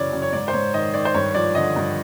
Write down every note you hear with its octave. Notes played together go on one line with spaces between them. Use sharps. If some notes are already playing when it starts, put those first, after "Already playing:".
Already playing: F#2 C#3 E3 C#5 D5
F#2
C#5
G#2 D5
C5
G#2 C#5
D#3 D#5
D#3 D5
C5
G2 C#5
F3 D5
D3 D#5
G2